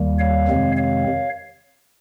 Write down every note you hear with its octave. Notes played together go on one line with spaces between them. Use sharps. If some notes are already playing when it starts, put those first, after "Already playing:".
Already playing: D#2 D#3 G3 A#3
C#5 F5
F2 C3 D#3 G#3 C4
C#5 F5